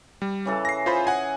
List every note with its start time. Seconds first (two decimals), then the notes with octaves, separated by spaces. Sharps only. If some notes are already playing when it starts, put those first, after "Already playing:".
0.22 G3
0.45 C#3 E3 A4
0.65 A#6 C7
0.86 F4 G#4 C5 B5
1.07 F#5 G#5